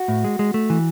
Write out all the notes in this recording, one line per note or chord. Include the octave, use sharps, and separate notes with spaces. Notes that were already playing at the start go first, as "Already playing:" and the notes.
Already playing: F#4
A2
G#3
G#3
A3
E3